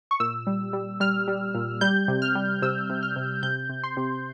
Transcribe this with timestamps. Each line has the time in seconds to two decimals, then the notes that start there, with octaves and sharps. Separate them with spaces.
0.11 C#6
0.20 A#2 E6
0.47 G3
0.73 G3
1.00 G3 F6
1.28 G3
1.55 A#2
1.81 G3 G6
2.08 C3
2.22 F6
2.35 G3
2.62 C3 E6
2.90 C3
3.03 F6
3.16 C3
3.42 C3 G6
3.69 C3
3.83 C6
3.97 C3